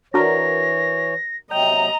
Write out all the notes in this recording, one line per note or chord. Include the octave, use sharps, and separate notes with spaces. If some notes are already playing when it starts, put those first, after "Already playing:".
E3 D4 F#4 A#4 C#5 A#6
C3 F#3 D#5 G5 A#5